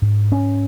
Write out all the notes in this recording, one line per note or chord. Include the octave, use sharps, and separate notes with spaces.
G#2
C#4